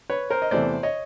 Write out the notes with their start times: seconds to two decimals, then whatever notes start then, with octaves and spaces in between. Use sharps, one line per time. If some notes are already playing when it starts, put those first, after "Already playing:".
0.10 B4 C#5
0.30 A#4 C5
0.42 D#5
0.51 E2 C3 E3 A3 C5 D5
0.83 C#5 D#5